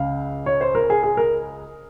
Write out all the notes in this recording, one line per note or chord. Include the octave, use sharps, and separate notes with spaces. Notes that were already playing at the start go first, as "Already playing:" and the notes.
Already playing: C#2 C#3 F5
C#5
C5
A#4
G#4
G#4
A#4